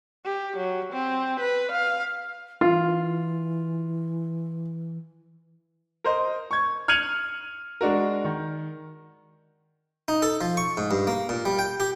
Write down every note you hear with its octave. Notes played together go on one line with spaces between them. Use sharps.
G4
F#3
C4
B4
F5
E3 F4
A#4 C5 D#5
C#6 G#6
F6 G#6 C#7 D#7 F7 F#7
G#3 D4 F#4 A#4
D#3
D#4
A4
F3
C#6
G#2
G2
A#3
A#2
G3
G5
G4